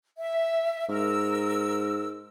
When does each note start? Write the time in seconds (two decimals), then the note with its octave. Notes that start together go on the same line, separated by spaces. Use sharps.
0.19 E5
0.89 G#2 A#4 E6